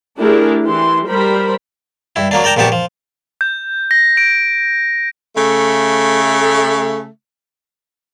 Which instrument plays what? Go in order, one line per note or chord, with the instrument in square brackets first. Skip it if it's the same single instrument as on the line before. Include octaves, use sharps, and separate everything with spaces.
[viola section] A3 D4 E4 G4 G#4 A#4
E3 E4 G4 C6
G3 A#4 C5 B5
[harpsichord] G2 E4
F#3 A#3 D4
A#4 D5 G5 A5 A#5
A#1 A#2 B3 G4 A5 C#6
F3
[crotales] G6
A#6
D7
[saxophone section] C#3 A3